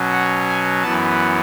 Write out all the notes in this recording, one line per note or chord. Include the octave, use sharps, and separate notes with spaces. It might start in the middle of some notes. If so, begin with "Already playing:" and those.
Already playing: B2 F#3 C#4
F#5
G#5
F#2 E3 B3 A5